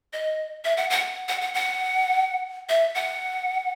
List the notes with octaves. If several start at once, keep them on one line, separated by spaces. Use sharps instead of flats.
D#5
E5
F#5
F#5
F#5
F#5
F#5
E5
F#5